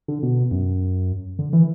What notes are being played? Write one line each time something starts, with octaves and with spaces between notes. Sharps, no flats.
D3
B2
F#2
D3
E3